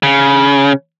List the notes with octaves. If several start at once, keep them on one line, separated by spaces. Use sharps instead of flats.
C#3